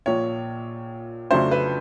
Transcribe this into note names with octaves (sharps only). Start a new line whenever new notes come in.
A#1 A#2 F3 C#5
F2 C#3 F#3 A3 D4 C5
B4